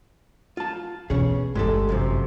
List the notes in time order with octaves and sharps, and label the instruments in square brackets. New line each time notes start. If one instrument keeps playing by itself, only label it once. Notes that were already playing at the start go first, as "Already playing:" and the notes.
[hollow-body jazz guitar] F4 A5
[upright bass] B2 E3 [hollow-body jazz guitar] C#4 G#4
[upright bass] G1 E4 [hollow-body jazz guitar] G#3 G4 A4
[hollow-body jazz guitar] F#2 C3 F3